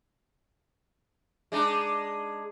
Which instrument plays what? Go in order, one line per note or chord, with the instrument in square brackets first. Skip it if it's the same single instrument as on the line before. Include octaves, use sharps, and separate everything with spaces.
[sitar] G#3 D4 D#4